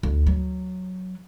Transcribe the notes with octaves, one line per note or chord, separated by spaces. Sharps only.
D2
F#3